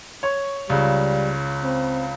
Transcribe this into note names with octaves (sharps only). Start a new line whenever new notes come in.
C#5 C#6
C#2 C#3 G3
C4